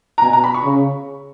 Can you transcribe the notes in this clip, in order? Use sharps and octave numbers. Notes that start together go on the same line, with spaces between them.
A#5
B2 G#5
A#5
B5
C#6
C#3